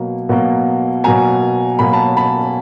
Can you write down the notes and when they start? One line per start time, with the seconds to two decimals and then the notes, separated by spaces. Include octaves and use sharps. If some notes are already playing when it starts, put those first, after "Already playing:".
Already playing: B2 F#3 A#3
0.29 B2 F#3 A#3
1.04 B2 F#3 A#3 G#5 A#5
1.79 B2 F#3 A#3 B5
1.93 A5 B5
2.17 A5 B5